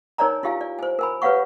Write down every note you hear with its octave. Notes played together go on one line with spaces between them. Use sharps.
D#4 A#4 C#5 D5 G#5 A#5
E4 F4 G4 F5 G#5
D5
C5 G#5
A#4 G#5 B5
G4 B4 C#5 F5 F#5 C#6